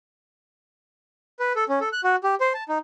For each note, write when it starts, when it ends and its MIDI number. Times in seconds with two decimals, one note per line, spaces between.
1.40 1.53 71
1.56 1.64 69
1.69 1.79 61
1.81 1.89 69
1.93 2.01 90
2.04 2.16 66
2.24 2.35 67
2.41 2.53 72
2.54 2.64 81
2.69 2.78 63